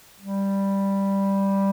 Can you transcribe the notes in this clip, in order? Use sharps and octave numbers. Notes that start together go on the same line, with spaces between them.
G3